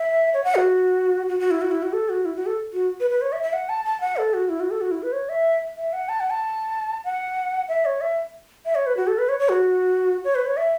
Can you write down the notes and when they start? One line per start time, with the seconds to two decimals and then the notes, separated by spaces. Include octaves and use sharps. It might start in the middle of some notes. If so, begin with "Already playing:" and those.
Already playing: E5
0.34 C#5
0.44 F#5
0.55 F#4
1.29 F#4
1.40 F#4
1.51 E4
1.61 F#4
1.71 E4
1.83 F#4
1.93 A4
2.09 F#4
2.25 E4
2.36 F#4
2.46 A4
2.73 F#4
3.00 B4
3.10 B4
3.22 C#5
3.32 E5
3.43 E5
3.53 F#5
3.69 A5
3.85 A5
4.01 F#5
4.17 A4
4.34 F#4
4.49 E4
4.60 F#4
4.71 A4
4.81 F#4
4.91 E4
5.02 B4
5.13 C#5
5.29 E5
5.77 E5
5.93 F#5
6.09 A5
6.20 F#5
6.30 A5
7.05 F#5
7.68 E5
7.85 C#5
8.01 E5
8.65 E5
8.75 C#5
8.86 B4
8.97 F#4
9.07 A4
9.18 B4
9.29 C#5
9.39 C#5
9.50 F#4
10.24 C#5
10.35 B4
10.46 C#5
10.57 E5